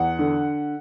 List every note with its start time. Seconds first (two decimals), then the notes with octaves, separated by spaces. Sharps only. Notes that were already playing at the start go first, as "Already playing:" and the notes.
Already playing: E2 F#5
0.19 D3